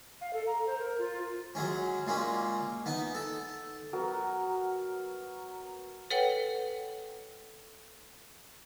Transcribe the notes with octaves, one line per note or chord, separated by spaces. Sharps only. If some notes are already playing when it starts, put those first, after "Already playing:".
F5
A4
A#5
C5
A#4
F4
F#3 G#3 C#4
A#2 G#3 A#3 C#4
B3 D#4
A4
F#3 B3 A#4 A#5
A4 B4 C#5 F#5 G5